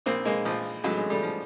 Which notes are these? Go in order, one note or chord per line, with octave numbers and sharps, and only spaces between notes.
A#1 A#3 C4
G#3 A#3
A#1 F3
A2 F#3 G#3
G#3
G3 A3
F3